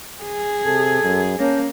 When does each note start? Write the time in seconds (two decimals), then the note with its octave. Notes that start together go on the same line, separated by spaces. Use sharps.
0.22 G#4
0.64 C3 A4 A5 G#6
1.02 F#2
1.39 A#3 C#4 C#5 A5 G6